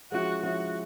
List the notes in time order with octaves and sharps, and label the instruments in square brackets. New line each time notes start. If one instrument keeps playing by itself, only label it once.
[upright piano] F3 G#3 C#4 E4 [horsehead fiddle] F#4
[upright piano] F3 G#3 C#4 E4 [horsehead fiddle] F#4